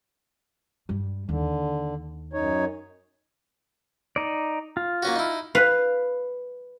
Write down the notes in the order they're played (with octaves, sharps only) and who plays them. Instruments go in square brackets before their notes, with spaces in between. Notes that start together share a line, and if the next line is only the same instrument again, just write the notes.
[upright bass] G2 G3
[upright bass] D#2 [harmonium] D3
[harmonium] F#2 D#4 C#5
[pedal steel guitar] D#4 D5
F4
[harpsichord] A#3 C#4 F#4
D#4 E4
[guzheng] B4 F5